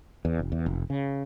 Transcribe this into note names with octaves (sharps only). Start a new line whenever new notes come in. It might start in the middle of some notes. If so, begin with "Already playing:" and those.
E2
F1
E2
F1
C#3